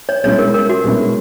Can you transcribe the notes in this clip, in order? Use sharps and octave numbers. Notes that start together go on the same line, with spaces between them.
C#5
B2 G#3 C#4 E4 C#5
A#4
A#4
F#4
B2 G#3 C#4 E4